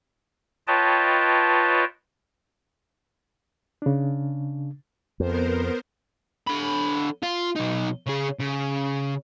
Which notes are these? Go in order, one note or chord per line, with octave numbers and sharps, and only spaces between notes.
F4 B4 C#5 D#5 G5 A5
C#3 D4
F2 B3 A#4 C5
D3 B5
F4
B1 D#4
C#3 G#4
C#3